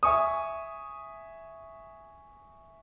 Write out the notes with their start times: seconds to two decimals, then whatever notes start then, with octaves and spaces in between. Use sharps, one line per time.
0.03 E5 G#5 C#6 D#6